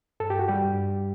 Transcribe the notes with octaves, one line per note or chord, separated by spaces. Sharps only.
G2 A4
G4
F#4
G3 G4
G2